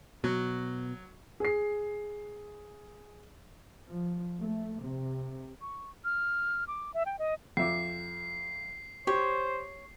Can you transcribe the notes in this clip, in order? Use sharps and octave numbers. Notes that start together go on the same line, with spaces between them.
B2 F#3
G#4 C7
F3
A3
C3
C#6
F6
D6
E5
G5
D#5
F2 E5 D6 C7
G4 C5 C#5